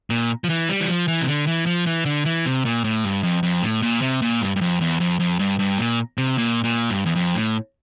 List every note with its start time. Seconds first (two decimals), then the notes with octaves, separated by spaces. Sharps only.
0.10 A#2
0.44 F3
0.49 E3
0.69 G3
0.80 E3
0.88 F3
1.08 E3
1.22 C3
1.28 D3
1.47 E3
1.66 F3
1.86 E3
2.06 D3
2.25 E3
2.45 C3
2.65 A#2
2.84 A2
3.04 G2
3.23 F2
3.43 F2
3.63 A2
3.82 A#2
4.02 C3
4.22 A#2
4.42 G2
4.56 G2
4.61 F2
4.81 E2
5.00 F2
5.20 F2
5.39 G2
5.59 G2
5.78 A#2
6.18 C3
6.38 A#2
6.64 A#2
6.90 G2
7.06 E2
7.15 F2
7.35 A2